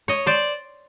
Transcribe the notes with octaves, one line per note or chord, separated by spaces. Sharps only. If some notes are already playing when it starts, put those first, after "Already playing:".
C#5 D#5
C5 D5